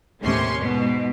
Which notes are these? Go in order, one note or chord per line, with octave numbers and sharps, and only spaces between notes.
D#2 A2 C3 C#4 C6 C#6
G#2 B2